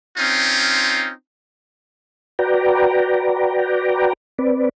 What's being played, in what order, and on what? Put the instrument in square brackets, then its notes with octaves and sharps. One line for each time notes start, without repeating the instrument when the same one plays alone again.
[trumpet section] C4 C#4 D#4 F4
[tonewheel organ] F#4 B4 D5 G5 A#5
C4 B4 D5